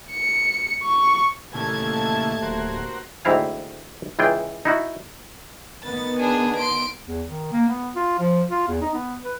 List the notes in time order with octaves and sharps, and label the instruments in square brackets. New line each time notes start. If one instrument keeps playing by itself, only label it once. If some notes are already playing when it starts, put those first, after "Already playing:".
[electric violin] C#7
C#6
[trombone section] D#2 A3 [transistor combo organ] A#2 C#3 E3 [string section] A5 G#6
[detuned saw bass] D1 [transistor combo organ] F#4 A#4 C5
[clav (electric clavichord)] D2 G#2 C4 E4 F5 G#5
C#2 E3 F4 G#4 G5
D#4 E4 F#4
[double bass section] D#3 B3 [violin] A6
[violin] D4 G#4
C6 D7
[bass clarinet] E2
D#3
A#3
B3
F4
F3
F4
E2
D#4
B3
B4